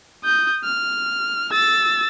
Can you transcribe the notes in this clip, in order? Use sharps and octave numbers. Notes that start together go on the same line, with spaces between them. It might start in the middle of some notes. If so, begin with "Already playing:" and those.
D#6 G6
F6
E6 A6